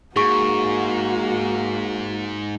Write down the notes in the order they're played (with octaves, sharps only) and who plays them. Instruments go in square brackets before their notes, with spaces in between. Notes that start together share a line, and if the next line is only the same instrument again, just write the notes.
[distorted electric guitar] G#2 [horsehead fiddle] A#3 F#4 [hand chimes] G#4 C#6